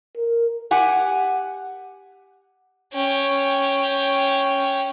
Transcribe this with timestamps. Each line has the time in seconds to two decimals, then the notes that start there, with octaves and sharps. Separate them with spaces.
0.17 A#4
0.71 G4 F#5 G#5
2.93 C#4 G5